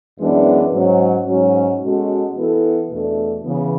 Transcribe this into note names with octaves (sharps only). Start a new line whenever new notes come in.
F#2 E3 G#3 B3 D4
G#2 F#3 C#4
G#2 F#3 C#4
B2 G#3 C#4 F#4 A4
E3 B3 E4 A4
E2 B2 A3 D4 A4
C#3 E3 B3